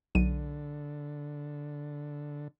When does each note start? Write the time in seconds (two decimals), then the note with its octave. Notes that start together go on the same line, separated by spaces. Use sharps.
0.15 B1 D3 D#7